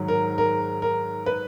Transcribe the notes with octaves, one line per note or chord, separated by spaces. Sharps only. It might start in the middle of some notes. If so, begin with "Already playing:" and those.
Already playing: G#2 D#3 F#3
A#4
A#4
A#4
B4